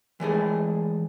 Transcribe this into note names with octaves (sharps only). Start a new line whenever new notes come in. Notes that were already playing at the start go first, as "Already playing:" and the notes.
E3 G#3 A3 G#4